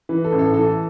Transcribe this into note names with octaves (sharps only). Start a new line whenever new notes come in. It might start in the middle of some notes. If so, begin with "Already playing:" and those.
E3 B4
A4
A1
A4
E3 A4